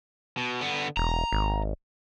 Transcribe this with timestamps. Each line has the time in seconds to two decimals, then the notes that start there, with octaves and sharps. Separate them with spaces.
0.37 B2
0.61 D3 B3
0.97 E1 A#5
1.32 G#1